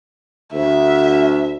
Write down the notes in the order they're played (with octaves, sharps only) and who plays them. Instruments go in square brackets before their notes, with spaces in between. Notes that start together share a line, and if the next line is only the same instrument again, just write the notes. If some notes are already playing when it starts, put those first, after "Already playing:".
[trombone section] D2 [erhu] E5